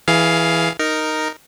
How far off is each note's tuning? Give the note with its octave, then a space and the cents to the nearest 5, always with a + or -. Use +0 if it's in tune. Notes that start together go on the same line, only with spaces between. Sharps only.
E3 +0 G#4 +20 F5 +0
D#4 +0 A#4 +0